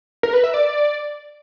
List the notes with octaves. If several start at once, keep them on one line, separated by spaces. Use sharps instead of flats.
A#4
B4
E5
D5